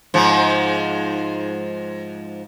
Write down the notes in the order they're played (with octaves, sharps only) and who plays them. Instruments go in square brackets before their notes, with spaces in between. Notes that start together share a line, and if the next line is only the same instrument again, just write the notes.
[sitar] G#2 F3